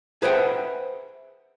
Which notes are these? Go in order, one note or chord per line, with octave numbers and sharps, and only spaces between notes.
G#4 B4 C5 E5 F#5 G5